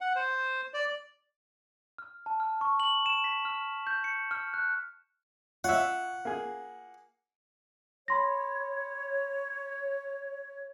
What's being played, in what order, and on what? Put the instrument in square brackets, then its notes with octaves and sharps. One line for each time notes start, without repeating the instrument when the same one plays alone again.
[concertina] F#5
C5
D5
[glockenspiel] F6
A5
F6
C#6
F#7
E7
B6
F6
G6
C#7
F6
F#6
[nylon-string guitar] F4 [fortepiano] C#5 E5 [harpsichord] F#5
[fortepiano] A#3 G#4
[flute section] C#5 [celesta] B5 C6 A#6